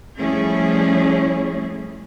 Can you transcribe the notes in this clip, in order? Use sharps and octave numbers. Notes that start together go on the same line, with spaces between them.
F3 G3 A3 C#4 E4 G#4